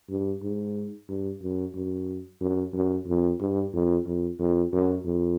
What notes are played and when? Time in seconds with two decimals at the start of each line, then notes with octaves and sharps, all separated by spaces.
0.10 G2
0.43 G#2
1.09 G2
1.42 F#2
1.75 F#2
2.41 F#2
2.74 F#2
3.07 F2
3.41 G2
3.73 F2
4.06 F2
4.39 F2
4.73 F#2
5.05 F2